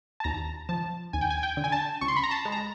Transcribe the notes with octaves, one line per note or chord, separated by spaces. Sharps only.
A5
D#2 A#5
F3 A5
D#2 G#5
G5
G#5
G5
D3
G#5
A5
C#2 C#6
C6
B5
A#5
A5
G#3
A#5